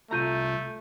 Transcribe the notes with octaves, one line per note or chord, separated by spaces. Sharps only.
C2 A3 F4 E5 A#5 G6 D#7